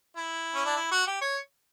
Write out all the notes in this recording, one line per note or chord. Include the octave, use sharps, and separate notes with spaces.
E4
C#4
D4
E4
F#4
G4
C#5